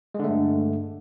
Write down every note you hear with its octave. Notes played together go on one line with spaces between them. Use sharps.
G2 D3 G#3 A3